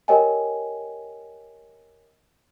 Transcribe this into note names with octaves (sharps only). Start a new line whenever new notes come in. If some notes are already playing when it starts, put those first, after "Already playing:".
G4 A#4 C#5 D#5 G5 G#5